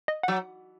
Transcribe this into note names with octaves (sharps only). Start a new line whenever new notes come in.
D#5
F#5
F#3